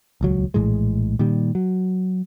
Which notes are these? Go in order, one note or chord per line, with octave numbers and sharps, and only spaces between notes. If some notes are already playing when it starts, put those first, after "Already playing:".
D#1 C#2 F#3
A#1 A2 E3 G#3
A#2 D#3 G3
F#3